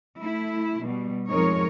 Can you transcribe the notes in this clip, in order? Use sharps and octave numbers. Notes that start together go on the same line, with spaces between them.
A3 E4
B2 G3
F2 G#2 G#3 D#4 A#4 C#5